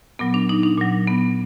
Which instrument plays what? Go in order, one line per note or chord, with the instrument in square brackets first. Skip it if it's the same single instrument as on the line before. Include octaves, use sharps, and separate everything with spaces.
[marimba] A#2 F#3 B3
D4
D#4
D4
A#2 F#3
B3